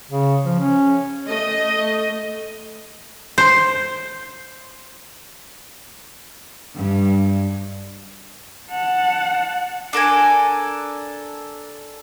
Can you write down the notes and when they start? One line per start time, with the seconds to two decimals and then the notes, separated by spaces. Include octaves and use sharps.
0.11 C#3
0.45 F3
0.60 C#4
1.27 A3 D#5
3.38 C5
6.75 G2
8.70 F#5 A5
9.93 D4 A4 A#4 G#5